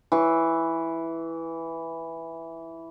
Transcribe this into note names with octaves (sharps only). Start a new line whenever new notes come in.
E3 C#6